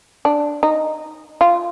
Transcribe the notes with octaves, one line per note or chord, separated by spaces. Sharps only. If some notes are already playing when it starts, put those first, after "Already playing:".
D4
D#4
F4